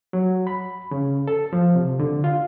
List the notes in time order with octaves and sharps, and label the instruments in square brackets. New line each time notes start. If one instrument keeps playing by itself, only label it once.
[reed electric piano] F#3
B5
C#3
A4
F3
C3
D3
F4